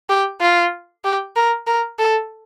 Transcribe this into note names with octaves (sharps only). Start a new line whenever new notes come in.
G4
F4
G4
A#4
A#4
A4